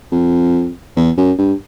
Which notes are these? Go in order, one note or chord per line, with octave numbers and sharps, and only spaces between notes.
F2
E2
F#2
G2